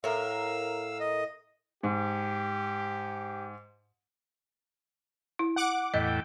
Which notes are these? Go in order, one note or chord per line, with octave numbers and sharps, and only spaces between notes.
A2 A#4 F5 E6
D#5
G#2 G4
E4
F#5 D6
E2 A2 D#5 G5